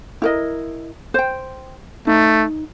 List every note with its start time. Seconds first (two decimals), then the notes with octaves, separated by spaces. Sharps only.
0.22 E4 A#4 D#5
1.14 C5 G5
2.07 A3 D#4